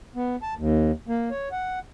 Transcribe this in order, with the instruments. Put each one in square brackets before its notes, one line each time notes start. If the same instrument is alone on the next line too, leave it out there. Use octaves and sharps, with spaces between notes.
[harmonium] B3
A5
D#2
A#3
C#5
F#5